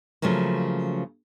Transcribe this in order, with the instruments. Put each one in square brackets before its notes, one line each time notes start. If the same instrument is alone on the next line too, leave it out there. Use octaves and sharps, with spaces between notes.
[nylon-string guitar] C#3 F3 F#3 A3 A#3